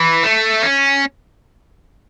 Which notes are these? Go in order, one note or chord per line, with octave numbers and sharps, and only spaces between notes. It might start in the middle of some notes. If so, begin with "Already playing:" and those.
Already playing: E3
A3
C#4